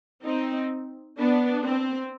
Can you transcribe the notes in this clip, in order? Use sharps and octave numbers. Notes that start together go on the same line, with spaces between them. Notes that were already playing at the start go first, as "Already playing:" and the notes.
C4 D#4
B3 D4
C4